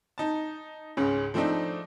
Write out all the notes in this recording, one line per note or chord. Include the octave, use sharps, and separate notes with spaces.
D#4 A5
C#2 G#2 C#3 C#4
F3 A3 C4 D4 D#4